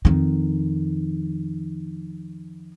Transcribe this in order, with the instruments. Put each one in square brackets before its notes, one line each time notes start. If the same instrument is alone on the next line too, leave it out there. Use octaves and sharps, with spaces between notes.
[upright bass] F2 D#3